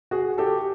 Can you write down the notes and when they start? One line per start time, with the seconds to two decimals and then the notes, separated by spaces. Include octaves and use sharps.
0.11 F#4 G#4
0.38 G4 A4